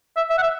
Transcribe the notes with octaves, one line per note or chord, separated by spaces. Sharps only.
E5
E5
F#5
E5